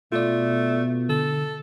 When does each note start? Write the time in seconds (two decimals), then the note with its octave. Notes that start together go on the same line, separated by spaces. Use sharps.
0.12 B2 A3 F4 D5
1.09 D3 A4